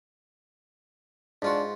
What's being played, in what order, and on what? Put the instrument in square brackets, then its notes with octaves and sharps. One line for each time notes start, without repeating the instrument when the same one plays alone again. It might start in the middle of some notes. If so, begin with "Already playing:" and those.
[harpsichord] G#2 F4 F#4 [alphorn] D4